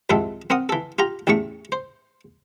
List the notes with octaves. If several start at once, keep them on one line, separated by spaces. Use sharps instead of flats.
C2 F2 G#2 D#3 A4 E5
C4 A#4 F#5 D#6
E3 A4
F4 G4 A#5
A1 E2 A2 A3 C#6
C5